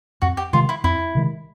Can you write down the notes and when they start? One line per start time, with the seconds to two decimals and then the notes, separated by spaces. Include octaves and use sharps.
0.22 F2 F#4
0.37 G4
0.53 C3 D#3 G#3 F4
0.69 E4
0.84 F2 E4
1.15 C3 D#3 G#3